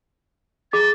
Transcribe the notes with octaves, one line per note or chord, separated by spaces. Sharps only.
G#4 D6 A6